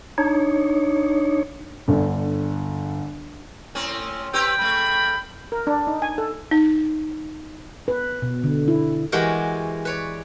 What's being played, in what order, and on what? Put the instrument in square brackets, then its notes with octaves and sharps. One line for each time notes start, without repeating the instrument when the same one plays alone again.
[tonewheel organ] D4 D#4 C#5
[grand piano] G1 D3
[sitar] A2 C4 C#4
[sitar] C4 G4 B4 [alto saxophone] G5 [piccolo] E6
[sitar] C#3 A3 [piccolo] B5
[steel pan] A#4
D4
D#4
G#5
A4
[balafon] D#4
[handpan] B4
B2
D3
E4
[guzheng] E3 G#3 F#4 G4 A#4
B4 C#5 D5